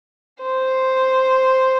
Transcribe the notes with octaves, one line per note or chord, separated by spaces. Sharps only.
C5